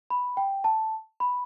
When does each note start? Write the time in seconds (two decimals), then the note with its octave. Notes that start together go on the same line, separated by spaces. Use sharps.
0.10 B5
0.37 G5
0.64 A5
1.20 B5